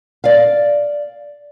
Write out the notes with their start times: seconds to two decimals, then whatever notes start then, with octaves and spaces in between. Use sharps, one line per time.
0.24 D5 F5